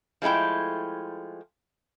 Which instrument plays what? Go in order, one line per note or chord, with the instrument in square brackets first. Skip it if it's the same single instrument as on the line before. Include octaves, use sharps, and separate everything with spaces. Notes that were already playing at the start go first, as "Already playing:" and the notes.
[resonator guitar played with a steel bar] F3 G#3 A3 E4 G5